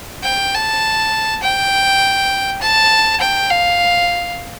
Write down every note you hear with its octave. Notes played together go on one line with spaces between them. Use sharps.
G5
A5
G5
A5
G5
F5